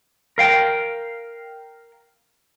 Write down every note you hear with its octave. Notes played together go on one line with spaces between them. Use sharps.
A#4 F5 G5